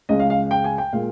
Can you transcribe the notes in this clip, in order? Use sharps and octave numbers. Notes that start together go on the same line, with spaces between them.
C#2 C#3 G#3 D#5
F5
F5
G5
G#5
G5
A#2 G#3 F5